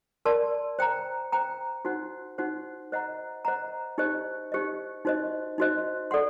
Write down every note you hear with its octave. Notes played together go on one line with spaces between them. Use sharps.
A#4 D5 A5 C6
C5 G5 A#5
C5 G5 A#5
D#4 F#4 C5 F#5
D#4 F#4 C5 F#5
C5 D#5 F#5 A#5
C5 D#5 F#5 A#5
D#4 G4 C5 D#5
D#4 G4 C5 D#5
D#4 F#4 C5 D#5
D#4 F#4 C5 D#5
A4 D5 F#5 C6